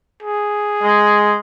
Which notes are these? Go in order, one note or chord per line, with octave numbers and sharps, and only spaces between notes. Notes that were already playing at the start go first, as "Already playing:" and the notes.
G#4
G#3